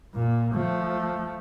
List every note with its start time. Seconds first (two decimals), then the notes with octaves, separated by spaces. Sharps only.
0.14 A#2
0.54 F3 A3